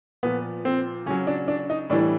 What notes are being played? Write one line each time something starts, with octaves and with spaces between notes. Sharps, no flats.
A#2 F3 B3
C4
C#3 F#3 C#4
D4
D4
D#4
A2 E3 G3 D4